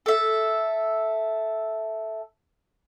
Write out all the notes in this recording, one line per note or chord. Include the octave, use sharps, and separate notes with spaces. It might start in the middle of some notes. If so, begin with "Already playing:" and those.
A4 E5